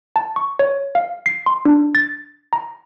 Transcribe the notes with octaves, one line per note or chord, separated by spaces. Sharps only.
A5
C#6
C#5
F5
C7
C6
D4
A6
A#5